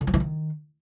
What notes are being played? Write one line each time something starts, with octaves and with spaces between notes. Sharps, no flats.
D3
F3
E3
D#3